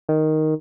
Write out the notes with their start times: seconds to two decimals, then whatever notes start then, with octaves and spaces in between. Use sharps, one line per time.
0.09 D#3